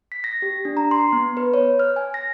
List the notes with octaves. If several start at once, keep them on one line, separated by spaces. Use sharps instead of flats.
B6
A#6
G4
D4
A#5
C6
B3
B4
C#5
F6
G#5
A#6